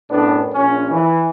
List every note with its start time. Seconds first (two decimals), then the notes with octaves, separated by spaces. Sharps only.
0.10 F#2 A2 B3 D4
0.53 A#1 C#4
0.90 E3